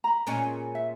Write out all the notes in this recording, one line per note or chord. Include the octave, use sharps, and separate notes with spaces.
A#5 B5
A#2 G#3 C#4
E5